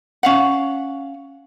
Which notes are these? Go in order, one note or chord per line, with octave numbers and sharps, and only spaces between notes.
C#4 F5 F#5